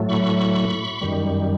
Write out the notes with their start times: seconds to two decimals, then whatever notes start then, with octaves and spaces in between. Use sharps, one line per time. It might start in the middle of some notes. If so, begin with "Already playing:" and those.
Already playing: A2 F#3 A3
0.09 B5 C#6
1.01 F#2 D#3 G3